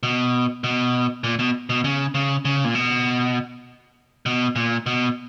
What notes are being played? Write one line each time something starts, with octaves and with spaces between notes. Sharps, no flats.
B2
B2
A#2
B2
B2
C#3
C#3
C#3
A#2
B2
B2
A#2
B2